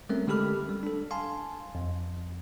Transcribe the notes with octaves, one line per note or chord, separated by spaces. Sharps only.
G3 A3 C4 C#4 A#4 E5
D3 G#3 G4 A4 B5 F6
G3
D4 A4
F5 G#5 A5 C6
F2